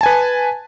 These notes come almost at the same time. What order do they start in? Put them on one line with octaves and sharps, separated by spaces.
A5 G#5 B4